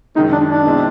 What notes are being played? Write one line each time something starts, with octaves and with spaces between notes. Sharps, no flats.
F#2 D#3 G#3 D#4
D4
D4
B2 G#3 C4 E4